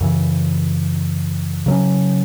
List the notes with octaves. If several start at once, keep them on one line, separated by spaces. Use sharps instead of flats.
F#2 C#3 E3
C#3 F#3 C#4